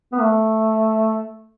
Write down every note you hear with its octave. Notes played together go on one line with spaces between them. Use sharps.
B3
A3